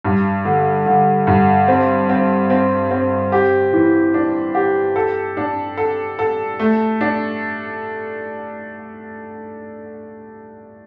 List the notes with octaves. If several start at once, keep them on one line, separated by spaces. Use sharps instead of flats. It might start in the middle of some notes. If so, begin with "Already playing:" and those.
G2
D3
D3
G2
C4
C4
C4
C4
G4
E3
D4
G4
A4
D4
A4
A4
A3
D4